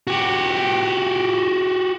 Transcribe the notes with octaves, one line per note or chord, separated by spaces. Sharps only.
F#4 G4